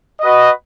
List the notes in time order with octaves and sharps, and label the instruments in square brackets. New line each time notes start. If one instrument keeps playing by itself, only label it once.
[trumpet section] F#4 B4 D#5